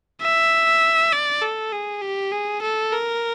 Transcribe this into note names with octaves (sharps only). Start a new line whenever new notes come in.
E5
D5
A4
G#4
G4
G#4
A4
A#4